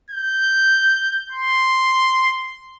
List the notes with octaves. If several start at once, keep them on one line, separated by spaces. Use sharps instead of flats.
G6
C6